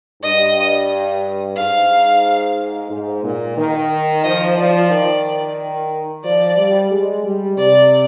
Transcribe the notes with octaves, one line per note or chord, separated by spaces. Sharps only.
G2 D#5
G#2 F5
G#2
A#2
D#3
F3 D#5
F3 D5
D#3 D5
F3 D5
G3
G#3
G3
C3 D5